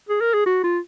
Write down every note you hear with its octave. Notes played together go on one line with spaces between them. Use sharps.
G#4
A#4
G#4
F#4
F4